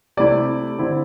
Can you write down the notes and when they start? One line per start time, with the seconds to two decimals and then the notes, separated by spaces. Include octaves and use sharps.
0.17 C3 A3 E4 D5
0.78 D3 C4 E4